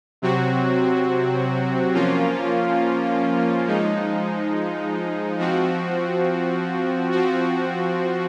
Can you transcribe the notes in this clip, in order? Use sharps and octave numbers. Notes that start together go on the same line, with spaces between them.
C3 F#3 C4 F#4
F3 A#3 C#4 F4
F3 G#3 D#4
F3 C4 F#4
F3 C4 F#4